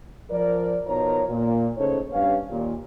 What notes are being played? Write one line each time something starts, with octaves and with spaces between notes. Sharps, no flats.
F3 A#4 D5
B2 F3 D#4 A#4 C#5 A#5
A#2
C#3 A3 D#4 A4 C5 C#5
G2 B3 C#4 F5
D#2 A#2